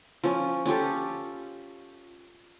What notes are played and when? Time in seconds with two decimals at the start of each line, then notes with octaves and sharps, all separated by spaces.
0.23 F3 C#4
0.66 C#4 F4 G4 A4